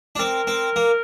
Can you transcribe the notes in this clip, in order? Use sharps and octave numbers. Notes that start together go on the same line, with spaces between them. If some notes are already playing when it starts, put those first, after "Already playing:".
D4
C4 A#4
C4
A#3